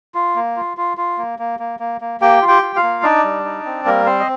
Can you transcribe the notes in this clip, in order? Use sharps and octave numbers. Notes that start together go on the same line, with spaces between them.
F4
A#3
F4
F4
F4
A#3
A#3
A#3
A#3
A#3
A#3 G4 G5
F4
G4 G5
F4
F4 F5
A#3
D4 D#4 D5
G3
D#4
C4
G3 A#3 A#4
C4 C5
D#5